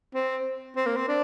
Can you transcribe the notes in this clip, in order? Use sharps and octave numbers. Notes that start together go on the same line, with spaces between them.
C4
C4
A#3
C4
D4